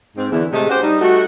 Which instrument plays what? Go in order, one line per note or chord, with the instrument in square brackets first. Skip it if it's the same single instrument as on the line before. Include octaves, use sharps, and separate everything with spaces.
[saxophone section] G#2 C4
E2 D3 E4
A2 C3 G#3 A3 G#4 D#5
C#4 F#4 G4 C5
G3 D#4
G3 A3 D#4 F#4